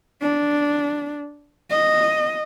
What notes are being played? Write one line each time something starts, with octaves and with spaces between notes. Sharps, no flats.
D4
D#5